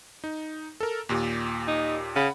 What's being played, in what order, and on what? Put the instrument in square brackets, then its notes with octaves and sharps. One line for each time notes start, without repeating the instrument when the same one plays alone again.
[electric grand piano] D#4
A4 A#4
D#2 A#2 G4
[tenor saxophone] D#4
[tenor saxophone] C#3 [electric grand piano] F#5 B5